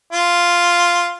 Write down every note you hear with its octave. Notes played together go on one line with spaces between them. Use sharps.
F4